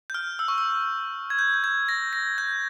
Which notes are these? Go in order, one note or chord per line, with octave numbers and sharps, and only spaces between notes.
G6
F6
E6
C#6
E6
G#6
G6
G6
G#6
A#6
A#6
G6